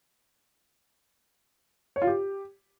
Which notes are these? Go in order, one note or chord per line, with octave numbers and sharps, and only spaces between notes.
C#5
F4
G4